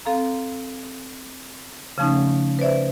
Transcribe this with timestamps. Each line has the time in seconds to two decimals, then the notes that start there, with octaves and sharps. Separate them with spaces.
0.05 C4 A4 F5 A#5
1.98 C#3 F3 A3 C#4 D#4
2.59 B4 C5 D5 E5